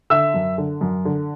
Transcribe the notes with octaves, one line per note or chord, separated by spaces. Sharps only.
D3 E5 E6
F#2
D3
F#2
D3